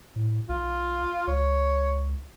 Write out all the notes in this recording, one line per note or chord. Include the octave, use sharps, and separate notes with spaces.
A2
B1 F4
C#2 C#5